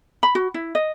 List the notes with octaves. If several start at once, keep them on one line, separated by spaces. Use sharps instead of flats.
B5
F#4
E4
D#5